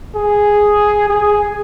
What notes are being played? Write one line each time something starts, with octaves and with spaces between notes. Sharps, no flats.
G#4
G#4